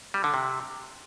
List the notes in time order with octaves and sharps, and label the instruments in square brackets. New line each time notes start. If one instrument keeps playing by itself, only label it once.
[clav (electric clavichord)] G3
D3
C3